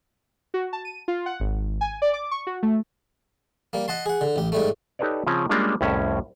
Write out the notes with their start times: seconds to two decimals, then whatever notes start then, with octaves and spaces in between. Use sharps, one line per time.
0.54 F#4
0.73 A5
0.85 D#7
1.08 F4
1.26 F#5
1.40 G#1
1.81 G#5
2.02 D5
2.13 D6
2.31 C#6
2.47 F#4
2.63 A3
3.73 G3 A#3
3.88 D#5 F#5 A5 C6
4.06 G#4 F#5
4.21 D3
4.36 A1 G4
4.52 G#2 G3 A3
4.99 D#4 G4 A4 B4 C#5 D5
5.27 C#3 F3 C4 C#4 F4
5.49 G3 G#3 A#3 C#4 D4 F4
5.81 C2 F2 A2 C#4 E5